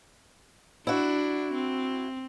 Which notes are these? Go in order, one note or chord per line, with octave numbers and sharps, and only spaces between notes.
D4 E4 F#4
C4